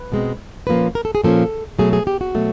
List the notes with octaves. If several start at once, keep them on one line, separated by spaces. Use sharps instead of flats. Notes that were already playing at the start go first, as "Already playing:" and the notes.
Already playing: B4
B2 G#3 C4
A#2 F3 A#3 C#4 B4
A#4
A4
G#4
A#2 F3 A#3 C#4 A4
B2 F#3 A3 G#4
G#4
G4
F#4
B2 F#3 A3